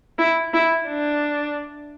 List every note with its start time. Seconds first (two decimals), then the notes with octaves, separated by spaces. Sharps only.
0.18 E4
0.54 E4
0.88 D4